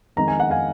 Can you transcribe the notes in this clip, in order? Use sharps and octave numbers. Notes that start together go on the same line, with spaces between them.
F2 D#3 G#3 A#5
G#5
F#5
F5 G#5